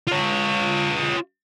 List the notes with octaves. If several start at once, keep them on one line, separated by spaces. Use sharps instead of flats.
F4 C#5